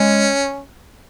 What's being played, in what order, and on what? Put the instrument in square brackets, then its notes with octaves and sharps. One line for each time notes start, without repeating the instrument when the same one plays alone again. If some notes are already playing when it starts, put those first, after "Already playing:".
Already playing: [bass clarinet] G#3 [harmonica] C#4